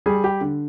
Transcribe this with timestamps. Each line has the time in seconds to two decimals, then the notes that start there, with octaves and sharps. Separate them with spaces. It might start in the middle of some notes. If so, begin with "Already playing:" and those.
0.06 G3 G#4
0.24 G4
0.41 D3